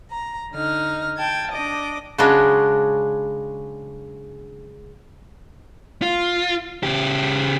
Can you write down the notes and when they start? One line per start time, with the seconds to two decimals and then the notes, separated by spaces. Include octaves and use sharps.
0.10 A#5
0.51 D3 D#4 F6
1.17 G5 A5 G#6
1.50 D4 D#5 D6
2.18 C#3 F#3 G#3 D4
6.02 F4
6.83 C#3 G4